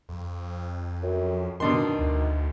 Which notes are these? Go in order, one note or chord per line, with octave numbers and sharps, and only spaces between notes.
F2
F#2
F#2 B2 D#3 D4 C6
D2